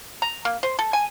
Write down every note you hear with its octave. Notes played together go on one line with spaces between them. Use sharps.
A#5
A#3
C5
A4
G#5